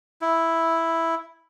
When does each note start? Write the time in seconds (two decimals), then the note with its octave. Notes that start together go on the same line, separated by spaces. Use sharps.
0.21 E4